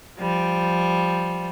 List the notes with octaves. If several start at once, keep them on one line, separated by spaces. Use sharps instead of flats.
F3 G3